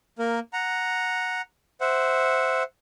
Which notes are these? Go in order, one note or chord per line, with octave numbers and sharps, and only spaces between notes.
A#3 A#4
F#5 A#5
C5 E5 F#5